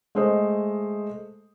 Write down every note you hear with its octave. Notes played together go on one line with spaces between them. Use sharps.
G#3 A3 C5 D#5